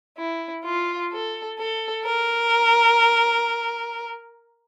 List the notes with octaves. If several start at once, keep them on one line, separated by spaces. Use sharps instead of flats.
E4
F4
A4
A4
A#4